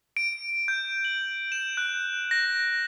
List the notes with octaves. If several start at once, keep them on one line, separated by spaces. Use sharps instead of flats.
D7
G6
F#7
E7
F#6
A#6